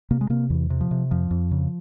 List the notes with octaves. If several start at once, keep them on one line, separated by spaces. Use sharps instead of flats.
C3 A#3
G#3
C3 A#3
E2 E3
C3
F3
C3
F2 F3
F2
C#3